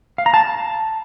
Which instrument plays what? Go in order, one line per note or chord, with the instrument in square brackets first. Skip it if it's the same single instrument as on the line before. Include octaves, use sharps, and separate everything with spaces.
[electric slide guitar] F5
A#5
A5